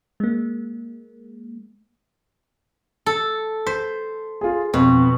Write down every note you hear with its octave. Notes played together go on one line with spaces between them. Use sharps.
G#3 A#3
A4
C5 B6
F4 G#4
F2 B2